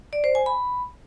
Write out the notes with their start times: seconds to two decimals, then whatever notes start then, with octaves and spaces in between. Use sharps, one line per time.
0.13 D5
0.24 C5
0.35 G#5
0.46 B5